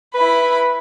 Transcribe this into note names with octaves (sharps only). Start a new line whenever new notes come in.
E4 B4 B5